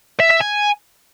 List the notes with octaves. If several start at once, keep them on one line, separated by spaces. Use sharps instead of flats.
E5
E5
G#5